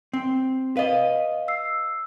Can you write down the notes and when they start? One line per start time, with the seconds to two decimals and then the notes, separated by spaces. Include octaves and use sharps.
0.13 C4
0.77 B4 D#5 F5
1.48 E6 C7